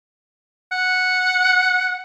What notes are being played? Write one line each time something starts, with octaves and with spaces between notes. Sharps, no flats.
F#5